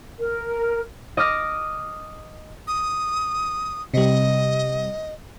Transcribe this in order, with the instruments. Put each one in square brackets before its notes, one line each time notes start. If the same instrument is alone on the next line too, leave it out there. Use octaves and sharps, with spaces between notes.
[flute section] A#4
[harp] D#5 D6 F6 A#6
[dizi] D#6
[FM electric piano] C3 G3 [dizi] D#5